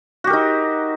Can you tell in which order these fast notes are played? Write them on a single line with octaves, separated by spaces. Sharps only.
F#4 G4 A#4 D#4